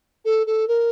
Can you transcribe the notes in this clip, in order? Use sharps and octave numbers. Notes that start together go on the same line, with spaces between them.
A4
A4
A#4